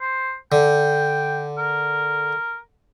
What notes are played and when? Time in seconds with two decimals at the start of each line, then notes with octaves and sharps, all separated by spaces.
0.01 C5
0.52 D3 G5
1.58 A#4